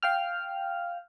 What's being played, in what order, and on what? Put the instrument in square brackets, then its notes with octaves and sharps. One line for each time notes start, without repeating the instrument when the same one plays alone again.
[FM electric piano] F5 G5 F6